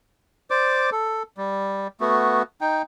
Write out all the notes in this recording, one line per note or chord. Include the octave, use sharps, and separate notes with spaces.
C5 D5 D6
A4
G3
A3 B3 F#4
D#4 G5